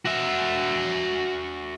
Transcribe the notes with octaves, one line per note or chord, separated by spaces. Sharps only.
F#4 E5